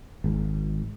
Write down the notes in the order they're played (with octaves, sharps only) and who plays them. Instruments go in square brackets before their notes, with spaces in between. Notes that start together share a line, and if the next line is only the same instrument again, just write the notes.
[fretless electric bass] G#1